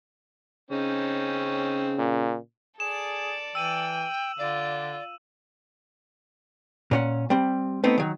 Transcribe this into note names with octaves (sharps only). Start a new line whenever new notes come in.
C#3 C4 C#4 D#4
A#2
G#4 A4 D5 E7
E3 G5 E6 D#7 F#7
D3 F4 D5
A#2 C#4 F#5
G3 C4
A3 B3 C4 D#4
D#3 F#3